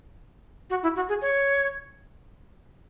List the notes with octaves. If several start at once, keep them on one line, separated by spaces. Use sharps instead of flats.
F#4
E4
F#4
G#4
C#5